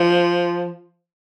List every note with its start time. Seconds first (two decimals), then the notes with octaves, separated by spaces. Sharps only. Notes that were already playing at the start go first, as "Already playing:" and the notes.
Already playing: F3